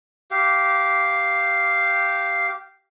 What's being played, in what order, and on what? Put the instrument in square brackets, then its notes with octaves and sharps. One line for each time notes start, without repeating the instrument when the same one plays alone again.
[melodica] G4 F5